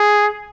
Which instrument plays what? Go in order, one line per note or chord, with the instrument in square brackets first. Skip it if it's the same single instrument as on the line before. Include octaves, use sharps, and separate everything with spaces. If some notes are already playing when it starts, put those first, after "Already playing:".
Already playing: [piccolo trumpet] G#4